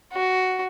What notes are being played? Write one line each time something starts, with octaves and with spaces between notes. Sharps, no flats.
F#4